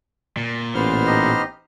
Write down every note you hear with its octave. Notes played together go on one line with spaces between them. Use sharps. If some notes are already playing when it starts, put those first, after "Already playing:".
A#2
A1 B3 C5 F6
D#4 G4 D#5